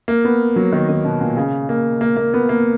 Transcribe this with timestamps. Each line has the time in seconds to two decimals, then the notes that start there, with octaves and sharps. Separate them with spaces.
0.08 A#3
0.25 B3
0.56 F#3
0.73 D#3
0.89 D#3
1.05 B2
1.21 A#2
1.37 C#3
1.69 A#3
2.01 A#3
2.17 A#3
2.34 B3
2.49 A#3